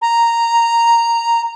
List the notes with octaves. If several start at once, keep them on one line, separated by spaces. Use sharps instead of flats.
A#5